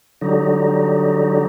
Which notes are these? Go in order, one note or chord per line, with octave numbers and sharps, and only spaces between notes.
D3 F#3 G3 D#4